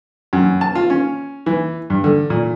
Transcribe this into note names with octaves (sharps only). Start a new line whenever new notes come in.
F#2
A5
F4
C#4
E3
G2
D3
A#2